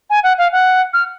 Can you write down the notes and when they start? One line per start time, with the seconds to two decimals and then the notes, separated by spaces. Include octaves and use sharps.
0.10 G#5
0.23 F#5
0.38 F5
0.52 F#5
0.93 F6